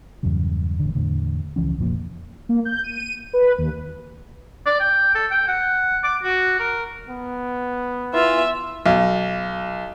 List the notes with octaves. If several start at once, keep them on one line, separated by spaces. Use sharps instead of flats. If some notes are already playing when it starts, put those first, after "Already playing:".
E2 G2 C#3 F#3
A1 D3
E2 A2 D3
C#2 E3 F3 C#4
F1 A#2 F3 A#3
A#3
G6
D#7
B4
D#2
D5
G5
A4
G5
F#5
D6
F#4
A#4
B3
E3 F4 E5
B1